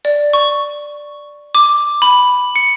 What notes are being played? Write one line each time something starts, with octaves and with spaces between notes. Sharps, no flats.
D5
C#6
D6
B5
C#7